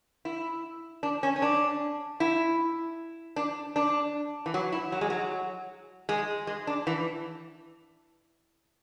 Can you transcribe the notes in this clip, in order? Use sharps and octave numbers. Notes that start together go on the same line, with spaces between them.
E4
D4
C#4
C#4
D4
E4
D4
D4
E3
F#3
E4
F#3
G#3
F#3
G#3
G#3
D4
E3